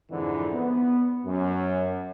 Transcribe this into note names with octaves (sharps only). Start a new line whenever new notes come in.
F2 G#2 D3 E3
B3
F#2